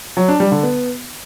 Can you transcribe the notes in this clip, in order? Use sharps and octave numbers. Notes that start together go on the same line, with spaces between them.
F#3
D4
G3
D3
B3